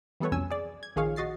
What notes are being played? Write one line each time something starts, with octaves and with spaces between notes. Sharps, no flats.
E3 G3 B3 A4 B4 C#5
C2 F2 B2 C#4 G#5 E6
G#4 D5
G#6
A#1 D#3 F3 G#4 C#5 F5
A#1 F#4 D#5 A6 C7